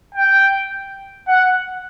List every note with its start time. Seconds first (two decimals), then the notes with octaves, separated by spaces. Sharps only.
0.15 G5
1.28 F#5